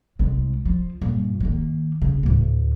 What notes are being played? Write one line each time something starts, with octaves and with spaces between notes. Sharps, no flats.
C2 G#3
F3
G2 A#2
D#3 A#3
C#3
D2 A2